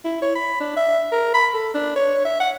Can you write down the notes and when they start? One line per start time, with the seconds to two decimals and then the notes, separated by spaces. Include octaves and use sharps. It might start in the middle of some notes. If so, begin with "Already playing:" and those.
0.05 E4
0.22 C#5
0.35 B5
0.60 D4
0.77 E5
1.12 A#4
1.34 B5
1.54 A4
1.74 D4
1.96 C#5
2.25 E5
2.40 F#5